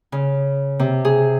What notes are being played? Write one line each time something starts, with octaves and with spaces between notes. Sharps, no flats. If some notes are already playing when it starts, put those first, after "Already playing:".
C#3
C3
G#4